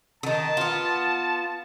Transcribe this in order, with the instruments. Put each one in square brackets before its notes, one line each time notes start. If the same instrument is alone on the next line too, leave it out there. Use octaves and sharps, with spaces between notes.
[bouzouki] D3 D#3 [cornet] A5
[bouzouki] B3 F4